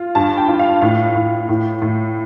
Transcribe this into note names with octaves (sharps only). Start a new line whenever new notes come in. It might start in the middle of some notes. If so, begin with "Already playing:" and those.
Already playing: F4
G2 A5
G5
F4
F5
A2 F5
A2
A2
A2